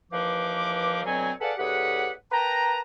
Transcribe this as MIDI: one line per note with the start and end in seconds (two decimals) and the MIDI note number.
0.12 1.01 39
0.12 1.01 52
0.12 1.01 53
0.12 1.01 71
0.12 1.01 77
0.12 1.01 86
1.05 1.31 38
1.05 1.31 47
1.05 1.31 54
1.05 1.31 60
1.05 1.31 73
1.05 1.31 80
1.41 1.53 68
1.41 1.53 69
1.41 1.53 71
1.41 1.53 74
1.41 1.53 77
1.41 1.53 78
1.58 2.12 38
1.58 2.12 45
1.58 2.12 67
1.58 2.12 68
1.58 2.12 71
1.58 2.12 78
2.32 2.81 70
2.32 2.81 71
2.32 2.81 79
2.32 2.81 81
2.32 2.81 82